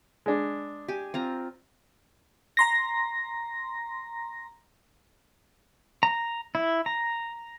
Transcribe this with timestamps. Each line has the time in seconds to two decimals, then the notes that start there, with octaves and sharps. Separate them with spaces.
0.26 G#3 D4
0.88 G4 G#5
1.14 C4 F4 A#5
2.57 A#5 C6 A#6
6.03 A#5
6.55 E4
6.86 A#5